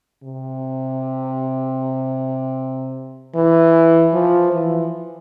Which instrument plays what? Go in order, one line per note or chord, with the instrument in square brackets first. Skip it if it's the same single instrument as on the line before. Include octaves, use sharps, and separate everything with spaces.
[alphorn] C3
E3
F3
E3